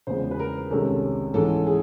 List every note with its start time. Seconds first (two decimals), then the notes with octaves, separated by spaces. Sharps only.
0.07 E2 C#3 F3 G#3 B3 C5
0.31 B4
0.39 A#4
0.71 C2 C3 D#3 G#3 C#4 A4
1.34 G#2 E3 G#3 C#4 A4
1.67 G#4